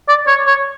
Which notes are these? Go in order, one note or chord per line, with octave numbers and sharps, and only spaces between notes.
D5
C#5
C#5